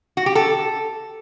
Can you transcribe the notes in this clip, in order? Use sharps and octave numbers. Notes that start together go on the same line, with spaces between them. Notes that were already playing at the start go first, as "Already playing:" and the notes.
F#4
G4
A4